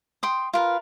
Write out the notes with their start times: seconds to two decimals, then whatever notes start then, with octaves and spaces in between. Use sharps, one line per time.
0.23 G5 C6 D#6
0.53 F4 A#4 B4